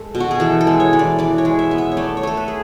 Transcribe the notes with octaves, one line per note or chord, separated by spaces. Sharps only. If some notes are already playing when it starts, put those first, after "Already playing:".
Already playing: G#3 A4
B2
F#4
G#4
E3 A4
A4
G#3
C#5
E3
D5
E3 D5
C#5
G#3
E5
B3
E5
C#5
A3 D5
C#5
A3 A4
B4
G#4